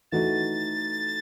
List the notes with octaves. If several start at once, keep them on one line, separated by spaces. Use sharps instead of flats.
E3 A3 D#4 F#4 A6